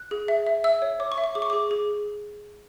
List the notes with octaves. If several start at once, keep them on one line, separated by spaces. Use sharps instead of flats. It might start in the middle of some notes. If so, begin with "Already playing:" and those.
Already playing: F#6
G#4
E5
E5
E5 E6
C#5
C#5 D6
C#6
E5
C#6
G#4 D6
C#6
G#4 D6
G#4